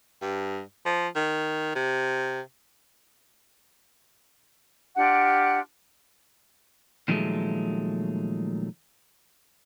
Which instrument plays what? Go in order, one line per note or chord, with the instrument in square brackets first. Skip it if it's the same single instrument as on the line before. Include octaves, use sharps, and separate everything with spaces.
[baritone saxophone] G2
F3
D#3
C3
[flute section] D4 F4 G4 F#5
[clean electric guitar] A#2 D#3 F3 F#3 G#3 A3